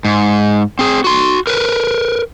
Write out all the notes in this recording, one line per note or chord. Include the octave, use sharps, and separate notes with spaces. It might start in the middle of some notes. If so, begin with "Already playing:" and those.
G#2
C4 G#4
F#4 C6
A#4 B4